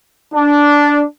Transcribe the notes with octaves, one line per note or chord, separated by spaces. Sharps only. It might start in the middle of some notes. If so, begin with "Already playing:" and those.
D4